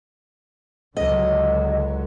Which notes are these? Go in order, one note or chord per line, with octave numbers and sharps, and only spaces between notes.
C#2 D3 F#3 D#5